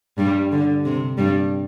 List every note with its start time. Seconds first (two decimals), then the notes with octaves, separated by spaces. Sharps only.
0.18 G2 G3
0.51 D3
0.85 C3
1.18 G2 G3